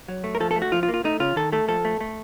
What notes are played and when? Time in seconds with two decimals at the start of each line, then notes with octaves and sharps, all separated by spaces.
0.08 F#3
0.24 A3
0.35 A#4
0.40 F3 A4
0.51 A4
0.56 A3
0.62 F#4
0.72 F3 F4
0.83 F4
0.88 A#3
0.94 F4
1.04 A3 D#4
1.20 C#3 F4
1.36 D#3 A4
1.52 A3 A4
1.68 F3 A4
1.85 A3
2.01 A3